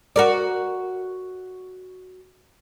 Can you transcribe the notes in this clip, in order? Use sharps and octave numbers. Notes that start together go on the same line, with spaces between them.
F#4 A#4 D5